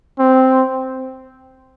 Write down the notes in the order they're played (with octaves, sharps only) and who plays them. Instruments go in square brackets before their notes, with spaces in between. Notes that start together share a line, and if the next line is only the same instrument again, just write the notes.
[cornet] C4